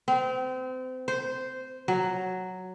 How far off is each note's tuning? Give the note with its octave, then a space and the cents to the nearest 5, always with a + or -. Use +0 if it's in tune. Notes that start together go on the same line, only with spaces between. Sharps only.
C4 -30
C5 -10
F#3 +0